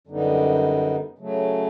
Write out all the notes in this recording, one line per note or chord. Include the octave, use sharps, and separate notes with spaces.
F#2 D3 G3 B3 D#4
C#3 F#3 A3